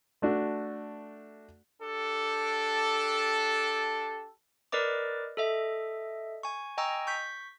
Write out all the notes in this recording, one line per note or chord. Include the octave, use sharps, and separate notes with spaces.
A3 D4 F#4
D4 G4 A4
A#4 B4 D5 D#5 D6
A4 D#5 E5
G#5 C#6
D#5 G5 G#5 A#5 C#6 E6
C#6 G6 B6